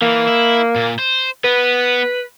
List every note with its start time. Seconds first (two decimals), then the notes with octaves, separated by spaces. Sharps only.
0.02 E3 A#3
0.28 E4
0.76 A#2
0.99 C5
1.44 B3 B4